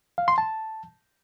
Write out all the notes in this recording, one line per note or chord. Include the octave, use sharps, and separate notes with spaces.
F5
C6
A5